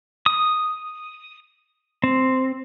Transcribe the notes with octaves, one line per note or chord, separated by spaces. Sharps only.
D#6
C4